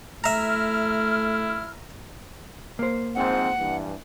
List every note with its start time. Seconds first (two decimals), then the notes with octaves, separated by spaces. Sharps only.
0.24 A3 E4 E5 A#5 F6
2.79 A#3 C5
3.15 G#2 F3 C4 F#5
3.58 G2 E3